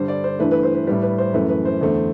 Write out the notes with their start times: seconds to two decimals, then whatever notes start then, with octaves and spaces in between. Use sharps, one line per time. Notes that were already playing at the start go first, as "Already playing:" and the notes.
Already playing: G2 D3 G3 C5
0.08 D5
0.24 C5
0.39 G2 E3 A3 B4
0.51 B4
0.63 C5
0.74 B4
0.87 A2 G3 B4
1.02 B4
1.18 C5
1.34 F#2 E3 A3 B4
1.49 B4
1.65 C5
1.81 E2 D3 A3 C5